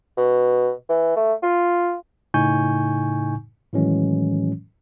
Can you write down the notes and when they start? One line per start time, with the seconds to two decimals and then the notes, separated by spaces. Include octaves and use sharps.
0.17 B2
0.89 E3
1.16 A3
1.43 F4
2.34 A2 C#3 D#4 G#5 C#6 G6
3.73 A2 D#3 E3 F#3 G#3 C#4